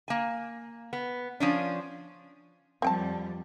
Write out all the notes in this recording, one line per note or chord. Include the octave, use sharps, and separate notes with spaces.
A#3 G#5
B3
F3 C#4 D4
F2 G3 C4 G5 A5